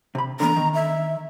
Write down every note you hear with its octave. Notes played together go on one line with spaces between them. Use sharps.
C3 B5
D3 E3 B3 A#5
D#3
E5